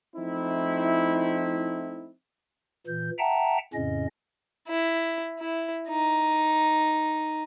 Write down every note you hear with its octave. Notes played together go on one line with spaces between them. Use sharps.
F3 A3 C4 D#4 E4
A#2 E3 G6
E5 F#5 G5 A5 A#5
F2 A2 C#3 C#4 D#5
E4
E4
D#4